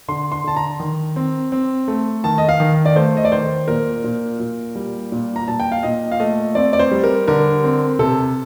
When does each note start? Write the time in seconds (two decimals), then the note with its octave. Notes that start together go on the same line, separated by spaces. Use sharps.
0.08 D3 C6
0.32 C6
0.44 D3 A5
0.57 A#5
0.80 D#3
1.16 C4
1.52 C4
1.88 A3
2.24 D#3 A5
2.38 D#5
2.49 F5
2.60 D#3
2.86 D5
2.96 A3 C5
3.17 D#5
3.25 D5
3.32 D#3 C5
3.68 A#2 A#4
4.04 A#2
4.40 A#2
4.75 G3
5.12 A#2
5.36 A#5
5.48 A#2 A5
5.60 G5
5.72 F5
5.83 A#2 D#5
6.12 F5
6.20 A3 D#5
6.55 C4 D5
6.73 D5
6.79 C5
6.91 G3
7.04 A#4
7.28 D3 A#4
7.64 C4
7.99 C3 A4